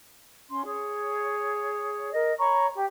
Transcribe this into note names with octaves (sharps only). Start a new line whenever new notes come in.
C#4 C6
G#4 C#5
A#4 D#5
C#5 A#5 B5 C#6
G4